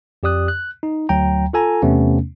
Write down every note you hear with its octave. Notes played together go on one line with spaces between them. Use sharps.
F2 G4 D5 D#6 F#6
F#6
D#4
D2 F#3 G5 A#5
F4 A4 G#5 A#5
E2 C3 A3 B3 C#4